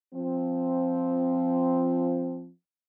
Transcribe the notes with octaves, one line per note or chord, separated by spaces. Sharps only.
F3 C4